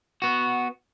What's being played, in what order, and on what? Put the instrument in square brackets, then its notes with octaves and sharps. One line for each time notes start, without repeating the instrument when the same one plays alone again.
[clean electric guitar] B3 F#4